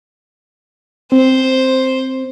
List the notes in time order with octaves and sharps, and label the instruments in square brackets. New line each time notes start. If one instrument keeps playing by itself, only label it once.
[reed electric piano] C4 [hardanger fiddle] C5